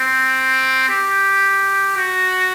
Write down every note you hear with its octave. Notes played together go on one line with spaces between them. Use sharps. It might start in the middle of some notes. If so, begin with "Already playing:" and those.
Already playing: C4
G4
F#4